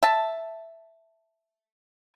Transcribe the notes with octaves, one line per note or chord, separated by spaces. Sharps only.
E5 A5